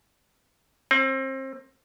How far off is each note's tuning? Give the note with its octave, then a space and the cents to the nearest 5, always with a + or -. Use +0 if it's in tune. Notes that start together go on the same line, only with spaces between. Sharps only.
C4 +30